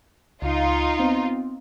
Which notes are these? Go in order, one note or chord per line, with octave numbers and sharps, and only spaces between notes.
C#2 D#4 F4
B3 C4